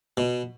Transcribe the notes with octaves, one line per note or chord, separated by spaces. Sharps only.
B2